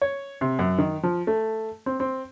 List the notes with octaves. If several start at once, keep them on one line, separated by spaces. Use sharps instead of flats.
C#5
C3
F#2
D#3
F3
A3
C4
C4